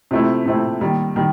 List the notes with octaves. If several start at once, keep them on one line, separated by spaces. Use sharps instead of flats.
C3 F3 A3 C4 E4
C3 F3 A3 C4 E4
D#3 G3 A#3
D#3 G3